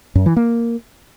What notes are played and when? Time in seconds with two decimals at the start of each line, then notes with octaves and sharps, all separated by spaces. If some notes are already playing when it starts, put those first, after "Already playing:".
0.15 F#2
0.26 E3
0.36 A#3